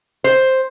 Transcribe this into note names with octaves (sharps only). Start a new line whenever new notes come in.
C5